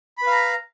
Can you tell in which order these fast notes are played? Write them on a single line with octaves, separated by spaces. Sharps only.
B5 B4 F5 A#5